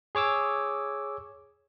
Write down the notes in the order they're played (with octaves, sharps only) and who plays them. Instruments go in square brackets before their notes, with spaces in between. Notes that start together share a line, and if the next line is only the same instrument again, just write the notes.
[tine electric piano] G#4 C#5 D6 E6